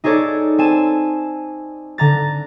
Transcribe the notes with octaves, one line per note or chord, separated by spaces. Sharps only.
D#4 G#4 A4 C#5 D5
C4 G#5 A5 E7
D3 A#5 A6